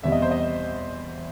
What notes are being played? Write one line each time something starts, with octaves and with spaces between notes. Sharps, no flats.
E2 B2 G3 C4 E5
D#5
C5
D#5